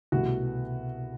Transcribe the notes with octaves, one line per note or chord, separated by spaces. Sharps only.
C2 B2 A3 F#4